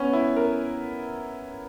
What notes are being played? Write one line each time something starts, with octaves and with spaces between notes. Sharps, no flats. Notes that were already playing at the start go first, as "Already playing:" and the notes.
Already playing: B3 C#4
E4
A#4